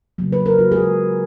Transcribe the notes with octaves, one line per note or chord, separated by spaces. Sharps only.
C#3 F#3 A#3
B4
A#4
F#3 A#3 F4 F#4
G#4